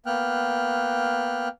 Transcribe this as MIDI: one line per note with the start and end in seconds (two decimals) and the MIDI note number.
0.06 1.48 58
0.06 1.48 59
0.06 1.48 79
0.06 1.48 89
0.06 1.48 90